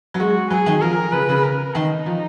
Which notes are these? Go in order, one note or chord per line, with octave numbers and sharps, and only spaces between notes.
F#3
G#3 F#4
F#3 G#4
D#3
F3 A#4
C#3 B4
C#3
A#4
D#3 D#4
F3